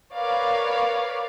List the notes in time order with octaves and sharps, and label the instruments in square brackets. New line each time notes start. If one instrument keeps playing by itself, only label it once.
[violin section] A#4 B4 C#5 D5 F5